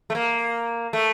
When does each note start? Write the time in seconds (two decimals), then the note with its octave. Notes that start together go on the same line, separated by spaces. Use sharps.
0.10 A3
0.15 A#3
0.93 A3